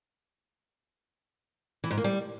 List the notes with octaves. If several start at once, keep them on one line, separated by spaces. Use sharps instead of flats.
E3
G#2
A#3
G3